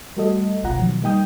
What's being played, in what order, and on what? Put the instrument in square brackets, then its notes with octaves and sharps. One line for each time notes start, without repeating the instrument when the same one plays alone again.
[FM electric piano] G3 A3 F#4 A4 D#5
G1 C2 B2 F4 F#5 A#5
B2 D#3 F3 F#3
G3 A#3 D#4 G5 D#6 G6